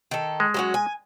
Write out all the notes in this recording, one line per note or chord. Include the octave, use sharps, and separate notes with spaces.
D#3 A4
G#3
F#3 C#4 F#4
G#5